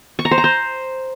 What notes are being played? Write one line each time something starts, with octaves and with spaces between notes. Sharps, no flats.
C#6
A#5
C5
A#5
C5